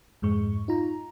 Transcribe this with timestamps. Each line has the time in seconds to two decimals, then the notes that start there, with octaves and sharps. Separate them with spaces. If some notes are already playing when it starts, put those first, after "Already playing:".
0.22 F2 G#2 G#3 C#6
0.68 D#4 F4 A#5